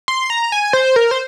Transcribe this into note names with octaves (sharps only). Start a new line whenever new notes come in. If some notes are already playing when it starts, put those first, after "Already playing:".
C6
A#5
G#5
C5
A#4
C5